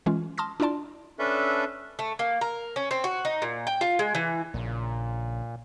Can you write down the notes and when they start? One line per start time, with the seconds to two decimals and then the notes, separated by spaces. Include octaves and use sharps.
0.06 E3 G#3 C#4 F4
0.38 A5 C6 D#6 F6 A#6
0.60 D4 E4 F4 D5 A5 C6
1.19 C#4 D4 A4 B4 E5
1.99 A3
2.19 A#3
2.41 A#4
2.76 C#4
2.91 C4
3.04 F#4
3.25 D#4
3.42 A#2
3.67 G5
3.81 F4
3.99 G#3
4.15 E3
4.54 A#1 A#2 C#3